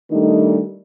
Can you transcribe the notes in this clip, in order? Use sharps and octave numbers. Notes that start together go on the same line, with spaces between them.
D#3 G3 A3 D4 D#4